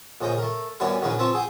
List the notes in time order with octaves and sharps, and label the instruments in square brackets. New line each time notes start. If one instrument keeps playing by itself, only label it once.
[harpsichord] A#1 C#3 D#5 G5
A3 A#4
F#2 E3 G3 B3 C#5 C#6
A#1 C#3 F#3 C#4 D#4 B4
F3 C4 B4 E5 A5 C#6
G#4 F#5 G5